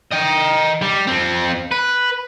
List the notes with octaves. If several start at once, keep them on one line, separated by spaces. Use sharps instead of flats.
D#5 G5
G3
F2 C4
B4